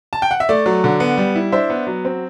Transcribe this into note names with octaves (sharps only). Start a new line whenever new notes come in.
A5
G5
F#5
E5
A3 D5
F#3
D3
B3
G3
E4
D4 C5 E5
B3
F#3
C4